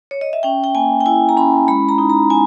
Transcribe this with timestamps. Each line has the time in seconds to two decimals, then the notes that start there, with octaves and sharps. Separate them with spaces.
0.11 C#5
0.21 D#5
0.33 E5
0.43 C#4 G5
0.64 G5
0.75 A#3 G#5
1.00 G5
1.06 E4 G#5
1.29 A#5
1.37 C#4 B5
1.68 G#3 B5
1.89 A#5
1.98 D#4
2.10 A#5
2.30 B3 G#5